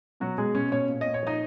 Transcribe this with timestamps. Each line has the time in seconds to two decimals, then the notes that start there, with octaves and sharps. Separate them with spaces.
0.20 B2 F#3 F#4
0.38 B2 G#3 G#4
0.55 B2 C#4 C#5
0.72 B2 C#4 C#5
0.89 A#2
1.01 A#2 D#5
1.14 C#5
1.23 F3 D#4 D#5